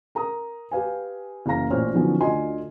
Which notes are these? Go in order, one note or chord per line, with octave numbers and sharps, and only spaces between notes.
A#4 A#5 D#6
G4 B4 F5 G#5
F#1 E3 A#3 F5 A#5 A#6
A1 A#2 C#4 C5 C#5 F6
D3 D#3 F3 F#3 B3 C#4
D2 D3 F4 D#5 G#5 C6